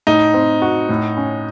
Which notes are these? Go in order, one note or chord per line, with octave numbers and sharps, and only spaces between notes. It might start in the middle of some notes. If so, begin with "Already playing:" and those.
A2 D#4
C4
F#4
A2
C#4